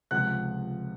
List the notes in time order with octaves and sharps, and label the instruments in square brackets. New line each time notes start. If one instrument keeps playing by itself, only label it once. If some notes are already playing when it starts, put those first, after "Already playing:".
[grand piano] C#2 C3 F3 F#5 F#6